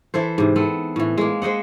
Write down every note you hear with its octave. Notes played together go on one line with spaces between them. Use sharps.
E3 E4 A4 C5
G#2 C3
B3 C4 A4
A2 E3
G#3 A#3
G#3 C5 D#5 F#5